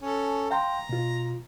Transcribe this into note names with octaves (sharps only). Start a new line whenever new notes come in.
C#4 A4
F5 G5 A#5 C6
B2 F4